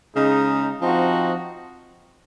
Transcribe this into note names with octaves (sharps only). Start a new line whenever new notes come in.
C#3 G#3 D#4
F3 C4 D#4 F#4